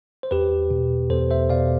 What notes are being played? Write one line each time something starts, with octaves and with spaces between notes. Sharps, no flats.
C5
E2 G4 B4
B2
E2 A4 C5
C5 E5
B2 D5 F5